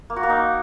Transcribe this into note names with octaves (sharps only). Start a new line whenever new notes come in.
A#3
F#4
A#3
D#4